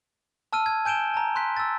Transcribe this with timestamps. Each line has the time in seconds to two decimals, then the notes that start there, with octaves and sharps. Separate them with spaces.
0.53 A5 E6 F6 D#7
0.66 G#6
0.85 G#5 G6 D7 E7 G7
1.14 A5 A#5
1.35 C6 F#6 B6
1.57 E6 A6